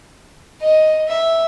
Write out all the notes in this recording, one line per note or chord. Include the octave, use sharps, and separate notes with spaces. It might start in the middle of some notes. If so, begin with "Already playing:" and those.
D#5
E5